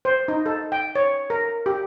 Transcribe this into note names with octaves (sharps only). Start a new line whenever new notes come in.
C5
D#4
A4
G5
C#5
A#4
G4